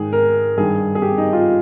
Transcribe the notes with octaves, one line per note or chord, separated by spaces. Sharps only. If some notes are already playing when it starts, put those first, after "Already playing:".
Already playing: G#2 D#3 G#4
A#4
G2 D#3 G#4
G#4
G4
D#4
F4